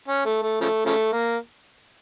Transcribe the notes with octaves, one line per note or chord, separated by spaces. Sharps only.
C#4
A3
A3
C#3 F3 A3
C#3 F3 A3
A#3